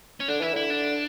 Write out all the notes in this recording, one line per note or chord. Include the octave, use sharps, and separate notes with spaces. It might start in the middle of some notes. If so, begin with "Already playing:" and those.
C#4
D3 D4
E3 E4
D3 E4
D4